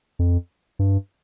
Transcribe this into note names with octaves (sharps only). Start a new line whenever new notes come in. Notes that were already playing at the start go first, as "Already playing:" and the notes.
F2
G2